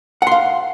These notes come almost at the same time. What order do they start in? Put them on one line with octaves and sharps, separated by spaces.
F#5 C6 F5